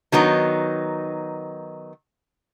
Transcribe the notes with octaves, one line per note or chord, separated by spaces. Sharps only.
D#3 F#3 B3 D#4